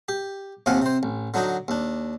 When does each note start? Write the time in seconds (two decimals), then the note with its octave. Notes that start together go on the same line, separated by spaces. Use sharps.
0.09 G4
0.66 D#2 C3 F3 F5 F#5 G#5
0.82 C3 C5
1.03 A1
1.34 D3 F#3 D4 D#4
1.68 D#2 D4